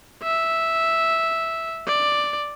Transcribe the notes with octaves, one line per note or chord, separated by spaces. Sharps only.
E5
D5